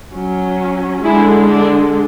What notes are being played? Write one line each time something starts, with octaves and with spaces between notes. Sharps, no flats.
F#3 C#4
D3 G#3 D4 E4 G#4
D4